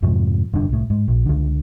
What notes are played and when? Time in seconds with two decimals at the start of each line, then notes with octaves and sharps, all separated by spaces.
0.02 F2 G#2 C3 F3
0.53 F1 G2 D3 D4
0.69 C2 A2
0.90 G#2
1.08 A#1
1.26 C#2 D3